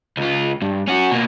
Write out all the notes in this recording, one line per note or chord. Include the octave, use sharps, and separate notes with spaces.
C#2 F4
G2
C#4 F#4
B2 A#3